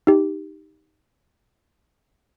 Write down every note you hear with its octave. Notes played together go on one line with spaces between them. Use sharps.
D#4 G4